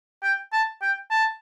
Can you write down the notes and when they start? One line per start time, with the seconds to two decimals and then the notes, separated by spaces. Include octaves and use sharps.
0.23 G5
0.53 A5
0.82 G5
1.11 A5